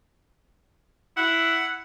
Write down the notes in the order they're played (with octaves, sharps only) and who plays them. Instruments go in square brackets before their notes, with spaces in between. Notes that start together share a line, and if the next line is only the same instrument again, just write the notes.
[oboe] E4 [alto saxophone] F#5